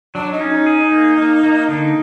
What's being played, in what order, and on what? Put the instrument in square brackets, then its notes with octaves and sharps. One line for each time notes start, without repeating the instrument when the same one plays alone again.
[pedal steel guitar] F#3 [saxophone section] D4
[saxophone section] D#4
[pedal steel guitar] C#4
[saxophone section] D#4
[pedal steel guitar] G#4
A#3
A#3
A#3
[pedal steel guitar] D3 [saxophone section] D#4